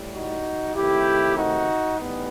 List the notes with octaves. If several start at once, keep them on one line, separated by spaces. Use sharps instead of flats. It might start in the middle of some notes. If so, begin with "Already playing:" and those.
Already playing: A2 G3
D#4 F#4
C3 D#3 A3 E4 G4
D#4 F#4
A2 E3 G3 B3 D#4